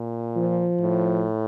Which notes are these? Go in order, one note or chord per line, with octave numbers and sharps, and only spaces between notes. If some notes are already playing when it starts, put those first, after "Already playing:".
Already playing: A#2
F3
A2